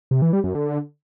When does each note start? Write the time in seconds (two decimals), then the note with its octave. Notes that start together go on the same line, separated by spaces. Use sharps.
0.11 C3
0.22 E3
0.33 G3
0.44 F#2
0.55 D3